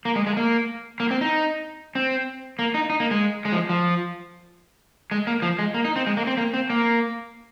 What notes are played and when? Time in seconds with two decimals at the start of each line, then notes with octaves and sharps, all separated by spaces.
0.05 A#3
0.16 G#3
0.27 G#3
0.37 A#3
1.00 A#3
1.11 C4
1.21 D#4
1.95 C4
2.59 A#3
2.74 D#4
2.90 D#4
3.00 A#3
3.11 G#3
3.45 G#3
3.52 F3
3.69 F3
5.11 G#3
5.27 A#3
5.42 F3
5.59 G#3
5.74 A#3
5.85 D#4
5.96 C4
6.07 G#3
6.17 A#3
6.27 C4
6.37 A#3
6.54 C4
6.70 A#3